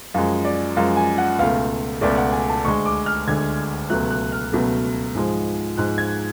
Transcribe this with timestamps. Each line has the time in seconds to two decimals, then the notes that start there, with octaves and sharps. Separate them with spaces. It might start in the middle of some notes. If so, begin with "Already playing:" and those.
0.14 F#2 F3 G#3 F5
0.45 D5
0.77 F#2 F3 G#3 F5
0.97 G#5
1.18 F#5
1.39 C#2 B2 A3 F5
2.01 C#2 B2 A3 D5
2.18 F#5
2.33 G#5
2.49 A5
2.65 D2 D3 G#3 C#6
2.86 D6
3.06 F6
3.27 D2 D3 G#3 G#6
3.90 C#2 B2 F#3 A3 F#6
4.10 F#6
4.32 F6
4.53 C#2 B2 F#3 A3
5.15 G#2 F3 G#3
5.77 G#2 F3 G#3 F#6
5.98 G#6